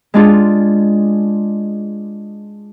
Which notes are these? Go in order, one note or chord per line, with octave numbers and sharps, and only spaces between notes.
G#3 D4 F4 G#4